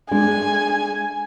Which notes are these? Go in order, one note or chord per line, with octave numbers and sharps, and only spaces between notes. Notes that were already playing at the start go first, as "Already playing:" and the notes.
G#3 D4 G#5